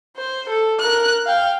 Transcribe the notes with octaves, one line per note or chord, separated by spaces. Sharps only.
C5
A4
A#4 F#6
F5 G5